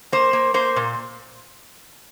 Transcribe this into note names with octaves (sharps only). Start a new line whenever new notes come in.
A#3 C5
A#3
A#3 C5
A#2